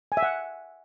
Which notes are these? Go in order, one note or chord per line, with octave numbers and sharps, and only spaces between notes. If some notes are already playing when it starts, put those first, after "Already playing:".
G#5
E5
F#5